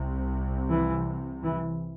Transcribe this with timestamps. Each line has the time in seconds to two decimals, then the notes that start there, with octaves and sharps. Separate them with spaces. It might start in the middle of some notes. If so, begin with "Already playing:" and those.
Already playing: C2 C3
0.68 E3
1.43 E3